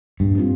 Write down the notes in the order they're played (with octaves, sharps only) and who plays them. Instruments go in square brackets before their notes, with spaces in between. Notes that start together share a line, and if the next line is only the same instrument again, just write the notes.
[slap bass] G2 [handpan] A#2
[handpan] G3 C4 F4